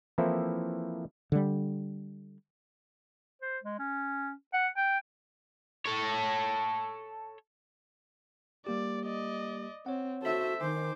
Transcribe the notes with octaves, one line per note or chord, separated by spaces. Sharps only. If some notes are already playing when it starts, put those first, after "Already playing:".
E3 F3 A#3 C4 E4 A4
D3 G3
C5
G#3
C#4
F#5
G5
A4 C#5
G3 A#3 G4 D5
D5 D#5
C4 C#5 F#5
F#4 A4 C5 E5
D#3 D#4 C5 G#5 D6